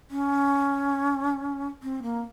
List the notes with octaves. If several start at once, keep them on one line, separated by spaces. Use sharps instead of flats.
C#4
C4
A#3